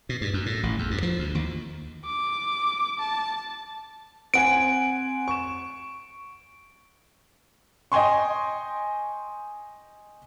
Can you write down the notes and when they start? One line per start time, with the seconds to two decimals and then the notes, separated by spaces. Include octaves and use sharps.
0.09 B2
0.21 G2
0.33 F#2
0.46 A2
0.63 A1
0.79 E2
0.91 G2
1.03 F3
1.19 D2
1.35 D#2
2.06 D6
3.00 A5
4.34 C4 F#5 G#5 D7
5.28 C#6 E7
7.92 D#5 G5 G#5 C6 C#6